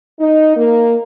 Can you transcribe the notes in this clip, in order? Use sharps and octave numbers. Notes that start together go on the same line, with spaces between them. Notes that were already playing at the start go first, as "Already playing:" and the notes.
D#4
A#3